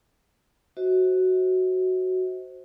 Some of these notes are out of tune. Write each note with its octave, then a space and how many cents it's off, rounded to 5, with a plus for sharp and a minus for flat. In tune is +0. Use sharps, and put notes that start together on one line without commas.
F#4 +5 C5 +0 D#5 +45